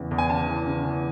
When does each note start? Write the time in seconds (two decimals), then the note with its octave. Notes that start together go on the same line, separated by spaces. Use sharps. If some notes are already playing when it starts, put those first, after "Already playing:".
Already playing: E2 C#3 E3
0.11 E2
0.18 G#5
0.30 C#3 A5
0.48 E3
0.66 C#3
0.84 E3